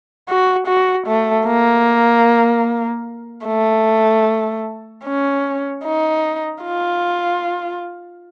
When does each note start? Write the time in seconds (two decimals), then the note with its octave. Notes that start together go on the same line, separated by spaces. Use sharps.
0.29 F#4
0.67 F#4
1.07 A3
1.47 A#3
3.46 A3
5.05 C#4
5.85 D#4
6.63 F4